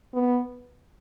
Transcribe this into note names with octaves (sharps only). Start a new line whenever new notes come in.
B3